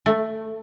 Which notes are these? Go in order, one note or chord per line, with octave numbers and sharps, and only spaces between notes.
A3